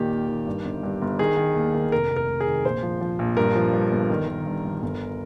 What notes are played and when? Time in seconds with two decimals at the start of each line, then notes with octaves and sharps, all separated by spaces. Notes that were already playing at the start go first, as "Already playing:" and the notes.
Already playing: D#2 A#2 D#3 G4
0.11 D#2
0.28 D#3
0.46 G2
0.65 G1
0.83 G2
1.02 G1
1.19 D#3 G#4
1.37 D#3
1.55 D#2
1.74 D#3
1.92 F1 A#4
2.10 F1
2.16 A#4
2.28 F1
2.40 G#4
2.47 D#3
2.65 A#1 C5
2.83 F3
3.01 F3
3.19 A#1
3.37 G2 A#4
3.56 F3
3.73 G2
3.92 G1
4.10 D#3
4.28 D#3
4.46 G2
4.64 G1
4.82 G1